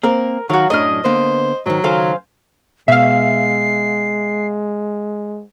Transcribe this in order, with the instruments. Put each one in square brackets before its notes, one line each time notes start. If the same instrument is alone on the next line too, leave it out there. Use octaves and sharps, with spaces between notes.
[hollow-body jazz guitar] A#3 C4 [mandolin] A#4
[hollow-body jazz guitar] D#3 [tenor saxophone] F#3 [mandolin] F#4 F5
[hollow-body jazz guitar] F#2 A2 D4 [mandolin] D#5 F6
[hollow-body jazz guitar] D3 A#3 B3 [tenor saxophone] C5
[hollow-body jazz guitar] G#2 D#3 [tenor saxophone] F#3
[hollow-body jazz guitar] C#2 D#3 A4 [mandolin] C5 F5 G#5
[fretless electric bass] B2 [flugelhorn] G#3 [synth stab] E5 F5 [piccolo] C7